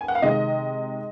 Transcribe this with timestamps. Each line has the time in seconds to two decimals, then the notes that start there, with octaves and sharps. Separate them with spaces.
0.01 G#5
0.08 F#5
0.15 F5
0.22 C3 D#3 G#3 D#5